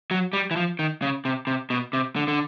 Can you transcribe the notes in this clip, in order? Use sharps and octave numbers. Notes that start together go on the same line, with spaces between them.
F#3
G3
E3
F3
D#3
C#3
C3
C3
B2
C3
D3
D3